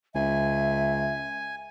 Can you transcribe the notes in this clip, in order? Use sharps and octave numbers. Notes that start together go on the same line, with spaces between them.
C#2 E5 G#5